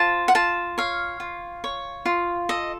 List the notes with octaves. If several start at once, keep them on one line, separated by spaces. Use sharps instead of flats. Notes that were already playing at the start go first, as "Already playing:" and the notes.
Already playing: F4 C5 A5
F#5
F4 A5
C#5 F5
F4
C#5
F4
A4 D#5